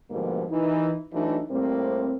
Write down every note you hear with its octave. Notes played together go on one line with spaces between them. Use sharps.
G#2 B2 D3 F3 G3 A#3
D#2 E3 D#4
E3 F#3 A3 D4 D#4
A2 G3 A#3 C4